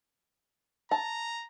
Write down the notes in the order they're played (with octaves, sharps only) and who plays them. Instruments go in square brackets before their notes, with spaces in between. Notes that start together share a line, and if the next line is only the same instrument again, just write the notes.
[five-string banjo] A5 [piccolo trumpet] A#5